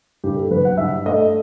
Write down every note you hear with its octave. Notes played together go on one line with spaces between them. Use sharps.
G2 G4
A4
F#3 B4
F#5
G2 E5
A3 D#5